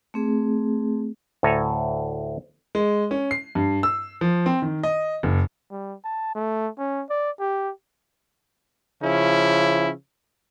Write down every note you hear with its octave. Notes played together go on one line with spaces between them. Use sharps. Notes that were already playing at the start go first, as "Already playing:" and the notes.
A3 C4 G#4
D2 A2 A4 G#5 A#5
G#3
C#4
C7
G2
E6
F3
C4
D#3
D#5
F#1
G3
A5
A3
C#4
D5
G4
C#3 F3 C#4 E4